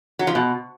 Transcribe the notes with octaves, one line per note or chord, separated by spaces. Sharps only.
F#3
F3
B2